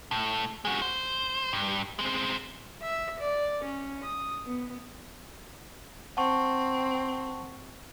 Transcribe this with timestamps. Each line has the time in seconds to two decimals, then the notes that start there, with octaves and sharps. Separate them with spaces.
0.11 A2
0.65 G#3 F#4
0.82 C5
1.53 G2
1.99 G#3 C4
2.82 E5
3.19 D5
3.63 C#4
4.03 D#6
4.45 B3
6.17 C4 F#5 A5 C#6